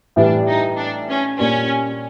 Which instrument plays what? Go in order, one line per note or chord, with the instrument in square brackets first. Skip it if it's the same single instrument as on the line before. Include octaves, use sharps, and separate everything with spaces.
[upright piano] A2 E3 G3 [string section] D4
[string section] D#4
D4
C#4
[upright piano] A#2 G3 A#3 D4 [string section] C#4